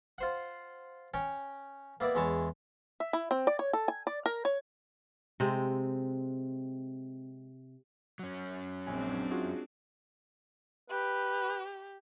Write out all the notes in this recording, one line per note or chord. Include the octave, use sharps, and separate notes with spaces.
F4 C5 F#5
C#4 C#5 G5
A#3 B3 E4 D5
E2 G#3 E4 C#5 A5
E5
E4
C4
D5
C#5
A4
G#5
D5
A#4
C#5
C3 G#3 C4
F#3 C#4
A#1 G#3 C4 D4 G#5
F4 F#4 G#4
G4 B4